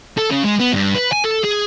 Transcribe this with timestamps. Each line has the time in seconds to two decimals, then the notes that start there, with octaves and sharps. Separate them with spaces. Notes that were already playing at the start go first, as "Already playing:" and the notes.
0.18 A4
0.30 C#3
0.44 G#3
0.59 B3
0.73 G2
0.95 B4
1.13 G#5
1.24 A4
1.44 G#4